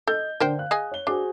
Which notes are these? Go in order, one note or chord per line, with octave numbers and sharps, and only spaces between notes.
A4 D#5 G6
D3 A#4 C5 G5
F5 F#6
G#4 D#5 G#5
C#5 G7
D4 F#4 G#4 C5